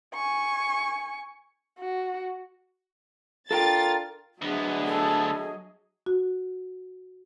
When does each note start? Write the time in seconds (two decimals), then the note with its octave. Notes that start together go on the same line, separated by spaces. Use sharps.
0.14 G#5 C#6
1.80 F#4
3.51 D4 F4 A4 A#4 G5 A6
4.42 D2 F#3 B3 D4 G#4 D#5 E5
4.86 A4
6.06 F#4